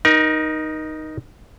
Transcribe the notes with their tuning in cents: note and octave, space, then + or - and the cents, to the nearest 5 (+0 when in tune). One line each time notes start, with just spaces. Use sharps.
D#4 +0 A#4 +30